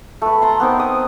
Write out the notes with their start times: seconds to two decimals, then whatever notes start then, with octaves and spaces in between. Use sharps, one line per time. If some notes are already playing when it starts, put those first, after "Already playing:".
0.22 A3 B4
0.42 A5 A#5 C6
0.60 B3 C4 D#4 A#4
0.80 D#6